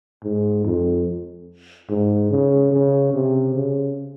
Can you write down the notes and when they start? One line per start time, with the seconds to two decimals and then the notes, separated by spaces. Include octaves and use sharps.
0.23 G#2
0.65 F2
1.89 G#2
2.31 C#3
2.72 C#3
3.13 C3
3.55 C#3